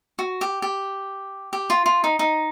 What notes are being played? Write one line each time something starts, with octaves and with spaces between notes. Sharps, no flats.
F#4
G4
G4
G4
F4
F4
D#4
D#4